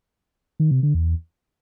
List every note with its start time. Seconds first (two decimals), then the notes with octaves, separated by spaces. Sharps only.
0.60 D#3
0.71 C3
0.83 D3
0.94 E2